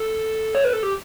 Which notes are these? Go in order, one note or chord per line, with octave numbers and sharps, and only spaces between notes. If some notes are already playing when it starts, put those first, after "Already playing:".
Already playing: A4
C#5
B4
A4
G4